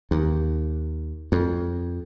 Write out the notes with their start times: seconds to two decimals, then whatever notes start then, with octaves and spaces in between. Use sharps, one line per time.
0.11 D#2
1.32 F2